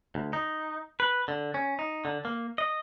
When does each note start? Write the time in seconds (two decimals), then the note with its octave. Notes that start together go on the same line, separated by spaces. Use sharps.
0.15 D2
0.33 D#4
1.00 B4
1.28 D3
1.54 C#4
1.79 D#4
2.05 D3
2.25 A#3
2.58 D#5